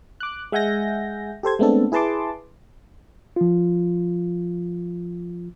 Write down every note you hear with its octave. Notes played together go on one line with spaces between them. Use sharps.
D6 F#6
G#3 E5 F#5 G#5 G6 A#6
G4 A4 C5 G#6
G#3 A3 B3 C4 D4 A4
E4 G#4 B4 A5 C6 D6
F3 F4